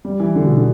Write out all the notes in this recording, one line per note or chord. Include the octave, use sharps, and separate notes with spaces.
G3
E3
D3
B2
D3